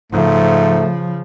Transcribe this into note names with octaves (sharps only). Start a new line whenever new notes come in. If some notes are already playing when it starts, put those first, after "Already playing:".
G#2 C#3 F3 A3